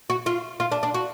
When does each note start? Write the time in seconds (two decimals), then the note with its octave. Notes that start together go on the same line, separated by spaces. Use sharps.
0.10 F#4
0.26 F4
0.60 F4
0.72 D4
0.83 D4
0.94 F#4